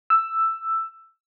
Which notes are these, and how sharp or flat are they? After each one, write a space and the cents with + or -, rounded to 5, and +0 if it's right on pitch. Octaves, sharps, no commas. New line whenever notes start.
E6 +5